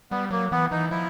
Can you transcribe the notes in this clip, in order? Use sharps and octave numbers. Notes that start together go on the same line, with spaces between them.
G3 B3
F#3 A#3
E3 B3
E3 D#4
F3 E4